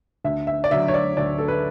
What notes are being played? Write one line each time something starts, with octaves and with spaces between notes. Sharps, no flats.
D2 E5
E5
D5
D3 F#3 E5
C#5
D5
D2 D5
A4
B4